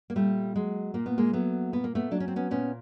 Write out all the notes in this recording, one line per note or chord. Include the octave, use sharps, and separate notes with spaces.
A#3
A#2 G3 A3
F#3 G#3
A#2 A#3
B3
G#3 A#3
F#3 A3 B3
A#2 B3
A#3
A3 B3
F#3 D4
C#4
C4
B3 C#4
A#2 B3 C#4